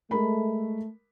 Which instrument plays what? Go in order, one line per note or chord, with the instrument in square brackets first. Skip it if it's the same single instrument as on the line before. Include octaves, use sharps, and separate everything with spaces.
[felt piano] G#3 A#4 B5 [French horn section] A3